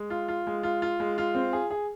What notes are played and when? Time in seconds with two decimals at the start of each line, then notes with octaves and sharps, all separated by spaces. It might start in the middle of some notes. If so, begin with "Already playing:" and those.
Already playing: G#3
0.10 F4
0.28 F4
0.47 G#3
0.63 F4
0.82 F4
1.00 G#3
1.18 F4
1.35 C4
1.53 G#4
1.70 G#4